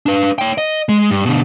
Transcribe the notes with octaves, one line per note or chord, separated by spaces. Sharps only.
D4 B4
C#5 G5
D#5
G#3
G2
B2 D3